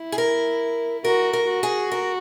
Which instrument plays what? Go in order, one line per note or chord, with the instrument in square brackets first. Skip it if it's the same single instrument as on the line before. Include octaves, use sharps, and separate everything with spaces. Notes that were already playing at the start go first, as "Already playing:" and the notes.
Already playing: [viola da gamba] E4
[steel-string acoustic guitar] G#4
A#4
[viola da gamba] F#4 [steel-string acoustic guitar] A#4
[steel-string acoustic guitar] A#4
[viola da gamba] F#4
[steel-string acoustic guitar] G#4
A#4